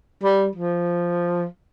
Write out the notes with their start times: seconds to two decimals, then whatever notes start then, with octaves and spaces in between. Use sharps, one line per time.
0.24 G3
0.55 F3